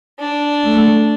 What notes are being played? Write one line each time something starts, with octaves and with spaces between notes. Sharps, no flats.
D4
A3